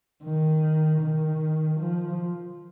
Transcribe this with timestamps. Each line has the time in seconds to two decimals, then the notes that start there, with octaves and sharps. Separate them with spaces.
0.24 D#3
1.02 D#3
1.80 F3